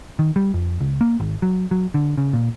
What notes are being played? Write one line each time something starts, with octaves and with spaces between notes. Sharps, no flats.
D#3
G3
F2
C#2
A#3
G#1
F#3
F#3
D3
C#3
A#2